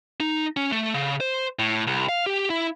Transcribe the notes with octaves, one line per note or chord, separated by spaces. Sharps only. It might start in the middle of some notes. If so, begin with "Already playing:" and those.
D#4
C#4
A3
C#3
C5
A2
C2
F5
G4
E4